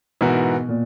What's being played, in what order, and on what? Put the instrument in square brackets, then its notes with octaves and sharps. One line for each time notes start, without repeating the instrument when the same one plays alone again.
[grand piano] G#2 E3 B3 F#4 A#4 [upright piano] B2
[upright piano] A#2